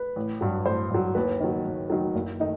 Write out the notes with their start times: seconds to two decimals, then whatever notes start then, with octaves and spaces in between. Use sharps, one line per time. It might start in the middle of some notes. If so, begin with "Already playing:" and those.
Already playing: B4
0.16 A1
0.41 G2 F#3
0.66 A1 C5
0.90 G2 F#3
1.15 D#2 B4
1.40 D#3 F#3
1.65 D#2
1.90 D#3 F#3
2.15 F#1
2.40 D#3 A3 D#4